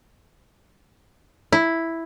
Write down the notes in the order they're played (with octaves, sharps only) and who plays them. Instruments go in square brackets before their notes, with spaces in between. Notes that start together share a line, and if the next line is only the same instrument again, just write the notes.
[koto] E4